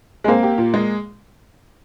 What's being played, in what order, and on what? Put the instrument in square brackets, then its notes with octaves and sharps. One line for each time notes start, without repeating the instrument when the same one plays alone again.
[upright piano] G#3
[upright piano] A#3 [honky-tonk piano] C4
[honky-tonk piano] G4
A#2
G#3